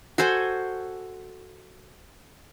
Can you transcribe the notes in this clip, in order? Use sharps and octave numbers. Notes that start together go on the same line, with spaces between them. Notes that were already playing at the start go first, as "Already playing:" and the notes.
F#4 A4 C5 G#5